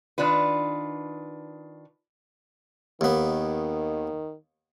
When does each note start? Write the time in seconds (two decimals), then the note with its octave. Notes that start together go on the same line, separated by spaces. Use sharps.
0.18 D#3 D4 F4 B4
3.01 D#2 D#3 B3